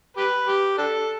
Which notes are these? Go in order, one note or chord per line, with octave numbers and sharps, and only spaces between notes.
G4 B4
G4
D4 A4